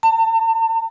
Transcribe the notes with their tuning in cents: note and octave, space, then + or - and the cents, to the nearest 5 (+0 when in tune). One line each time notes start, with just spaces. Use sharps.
A5 +40